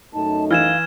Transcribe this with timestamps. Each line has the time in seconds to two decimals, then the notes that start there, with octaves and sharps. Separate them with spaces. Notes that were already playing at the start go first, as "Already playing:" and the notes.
0.14 F#2 A3 D#4 A5
0.51 E3 F5 F6 G#6 E7